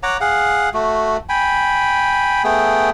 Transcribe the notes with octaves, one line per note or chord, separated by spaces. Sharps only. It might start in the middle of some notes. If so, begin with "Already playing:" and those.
C#5 F#5 A#5 D6
G#4 F5 F#5
A3 F#4
G5 G#5 B5
A3 B3 G#4 G5